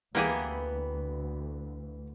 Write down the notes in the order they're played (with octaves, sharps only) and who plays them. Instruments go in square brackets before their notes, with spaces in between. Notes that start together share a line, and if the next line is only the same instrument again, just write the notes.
[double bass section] D2 [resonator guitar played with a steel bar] E3 B3 [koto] A#3 G4 G#4